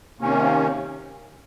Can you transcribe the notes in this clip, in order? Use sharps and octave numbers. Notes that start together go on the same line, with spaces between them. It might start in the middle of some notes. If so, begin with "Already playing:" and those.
C3 D#3 A#3 C#4